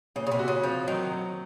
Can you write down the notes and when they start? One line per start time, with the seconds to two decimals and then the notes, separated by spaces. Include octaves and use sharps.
0.16 A#2 C#3
0.27 C#3
0.32 C3
0.39 F#4
0.48 C#3
0.64 F3 C4
0.87 D#3 F#3
1.11 F#3